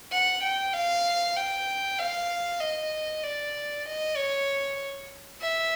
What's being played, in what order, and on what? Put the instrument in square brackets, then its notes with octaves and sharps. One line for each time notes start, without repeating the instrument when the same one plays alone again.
[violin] F#5
G5
F5
G5
F5
D#5
D5
D#5
C#5
E5